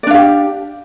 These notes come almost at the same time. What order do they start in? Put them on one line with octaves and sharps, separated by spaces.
D5 D4 F5 G4